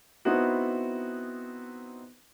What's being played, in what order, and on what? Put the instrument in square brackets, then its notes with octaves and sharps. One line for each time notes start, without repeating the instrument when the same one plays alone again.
[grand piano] B3 C4 D#4 E4 F#4